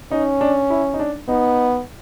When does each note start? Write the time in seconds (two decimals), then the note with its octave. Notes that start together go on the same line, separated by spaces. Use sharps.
0.11 C#4 D#4
0.41 D4
0.70 E4
0.94 D#4
1.00 D4
1.28 B3 D#4